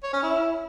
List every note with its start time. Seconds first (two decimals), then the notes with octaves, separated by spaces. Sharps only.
0.03 C#5
0.13 C#4
0.23 E4